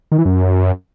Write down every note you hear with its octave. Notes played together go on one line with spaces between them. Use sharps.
D#3
E3
F#2